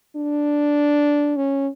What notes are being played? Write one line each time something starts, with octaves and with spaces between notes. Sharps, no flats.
D4
C#4